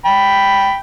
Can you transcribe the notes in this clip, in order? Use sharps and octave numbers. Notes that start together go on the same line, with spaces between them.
G5 B5